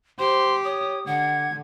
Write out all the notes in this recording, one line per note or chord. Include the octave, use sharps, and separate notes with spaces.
G4 C5 C6
C#5 D#6
D3 F#5 G#6